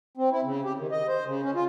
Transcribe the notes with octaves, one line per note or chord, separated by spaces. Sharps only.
C4
E4
C#3
G4
D#3
D#5
C5
C#3
C#4
F4